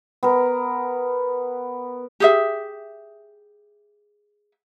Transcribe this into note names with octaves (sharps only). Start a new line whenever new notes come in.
B3 A#4
G4 G#4 E5